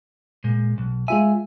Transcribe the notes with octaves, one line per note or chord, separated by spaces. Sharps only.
A#2 G#3
B1
G#3 F4 E5 G#5